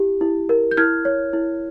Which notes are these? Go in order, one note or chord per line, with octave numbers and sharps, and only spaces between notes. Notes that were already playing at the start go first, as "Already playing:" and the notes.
Already playing: E4 G4
E4
A#4
G6
E4 F6 G#6
C#5
E4